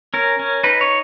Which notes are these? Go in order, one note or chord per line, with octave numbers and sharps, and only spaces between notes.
C#4 A#4
C#4
D#4 B4
C#5